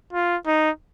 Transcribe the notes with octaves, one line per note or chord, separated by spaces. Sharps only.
F4
D#4